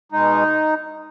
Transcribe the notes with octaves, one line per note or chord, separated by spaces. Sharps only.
B2 G#3 D#4